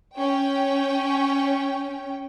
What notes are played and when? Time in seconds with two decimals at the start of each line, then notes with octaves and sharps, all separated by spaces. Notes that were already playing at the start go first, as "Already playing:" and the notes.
0.15 C#4 G5